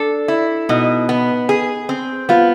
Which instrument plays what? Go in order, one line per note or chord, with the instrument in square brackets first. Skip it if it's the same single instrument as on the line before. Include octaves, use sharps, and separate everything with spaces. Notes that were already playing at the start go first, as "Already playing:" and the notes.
Already playing: [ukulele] D4 [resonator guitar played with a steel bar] A4
[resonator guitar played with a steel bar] E4
[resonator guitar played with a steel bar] B2 [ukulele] D#4
[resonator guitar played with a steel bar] B3
G#4
C4
[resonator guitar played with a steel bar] B3 [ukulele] F4